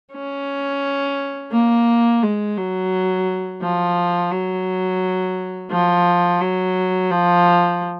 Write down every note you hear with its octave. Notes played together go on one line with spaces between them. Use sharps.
C#4
A#3
G#3
F#3
F3
F#3
F3
F#3
F3